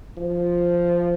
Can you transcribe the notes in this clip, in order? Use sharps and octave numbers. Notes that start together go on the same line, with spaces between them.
F3